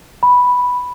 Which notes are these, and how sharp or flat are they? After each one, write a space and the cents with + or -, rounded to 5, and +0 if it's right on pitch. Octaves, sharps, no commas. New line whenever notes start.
B5 -5